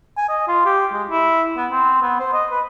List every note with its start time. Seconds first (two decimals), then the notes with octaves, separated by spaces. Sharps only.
0.17 G#5
0.28 D#5
0.48 F4
0.65 G4
0.92 G#3
1.10 E4
1.57 B3
1.71 C4
2.02 B3
2.20 C5
2.33 D#5
2.51 B4